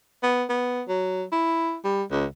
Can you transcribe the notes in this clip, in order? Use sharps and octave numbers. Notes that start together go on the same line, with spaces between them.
B3
B3
F#3
E4
G3
C#2